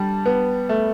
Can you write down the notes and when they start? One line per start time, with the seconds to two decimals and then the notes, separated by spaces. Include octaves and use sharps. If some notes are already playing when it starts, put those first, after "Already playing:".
Already playing: D3 G3 A5
0.26 B3
0.69 A3